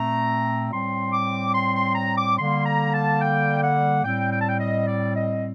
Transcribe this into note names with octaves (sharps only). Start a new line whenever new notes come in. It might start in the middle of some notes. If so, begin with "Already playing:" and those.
Already playing: A#2 A3 C4 A#5
A2 G3 C4 C6
D6
C6
C6
A#5
D6
D3 G3 A#3 C6
A#5
A5
G5
F#5
A2 G3 C4 G5
G5
A5
G5
D#5
D5
D#5